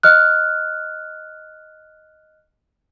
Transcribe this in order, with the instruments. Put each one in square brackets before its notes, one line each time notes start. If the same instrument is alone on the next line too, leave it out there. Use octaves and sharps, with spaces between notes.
[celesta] D#5 F6 F#6